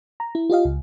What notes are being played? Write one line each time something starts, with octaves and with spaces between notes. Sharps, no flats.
A#5
E4
F4 G4 D#5 F5
C#2